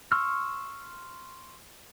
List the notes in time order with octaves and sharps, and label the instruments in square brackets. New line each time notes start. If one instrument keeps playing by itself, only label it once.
[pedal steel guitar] C6 C#6 E6 F6